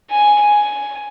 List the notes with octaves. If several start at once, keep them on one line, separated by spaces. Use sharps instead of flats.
G#5
G#5